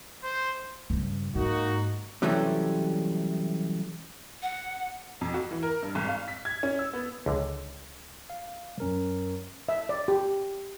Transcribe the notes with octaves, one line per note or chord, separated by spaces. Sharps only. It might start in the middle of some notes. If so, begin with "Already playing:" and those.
C5
G2 C#3
G#2 A#3 D#4 F#4
C3 E3 F#3 G3 A3 C#4
F#5
F2
F#4
E3
A#4
G2
G#1
F5
B6
G#6
C#4
E6
B3
C#2 D3
F5
F#2 C#4 A#4
E5
D5
G4